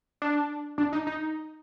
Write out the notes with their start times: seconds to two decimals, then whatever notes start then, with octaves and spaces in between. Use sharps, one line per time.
0.22 D4
0.78 D4
0.93 D#4
1.07 D#4